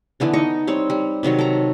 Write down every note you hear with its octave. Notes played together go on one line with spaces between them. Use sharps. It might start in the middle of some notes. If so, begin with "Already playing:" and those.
D3 E3 B3 D4
D#4 D#5 C#6
G3 C4 C#5
G3
C3 D#3 F#3 C#5
A4 A#5